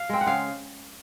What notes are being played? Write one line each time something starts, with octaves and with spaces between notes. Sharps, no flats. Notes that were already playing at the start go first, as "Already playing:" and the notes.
Already playing: F5
G#3 C4
F#5
C#3 F5